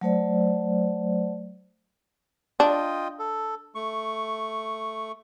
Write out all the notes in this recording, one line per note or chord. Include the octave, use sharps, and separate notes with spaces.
F#3 A3 C5 D5
D4 F4 D#5 G5
A4
A3 C#6